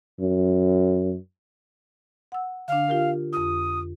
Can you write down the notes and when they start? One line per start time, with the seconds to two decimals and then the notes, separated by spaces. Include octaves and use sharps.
0.20 F#2
2.32 F#5 E6
2.68 D3 D4 F5
2.88 F4 G4 A#4
3.33 F2 F4 D#6